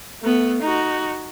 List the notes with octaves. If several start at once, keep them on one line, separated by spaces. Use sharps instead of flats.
A3 B3
D#4 F#4